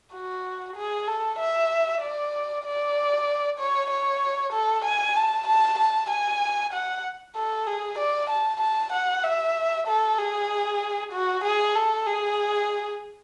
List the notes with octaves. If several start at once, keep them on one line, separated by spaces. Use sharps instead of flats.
F#4
G#4
A4
E5
D5
D5
C#5
C#5
A4
G#5
A5
A5
A5
G#5
F#5
A4
G#4
D5
A5
A5
F#5
E5
A4
G#4
F#4
G#4
A4
G#4